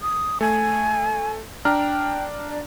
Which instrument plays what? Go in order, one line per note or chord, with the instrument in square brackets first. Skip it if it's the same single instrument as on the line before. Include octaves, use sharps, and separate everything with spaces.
[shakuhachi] D#6
[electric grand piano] A3 [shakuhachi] G#5
[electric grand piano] D4 A#5 F6 [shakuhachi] G5
[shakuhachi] D5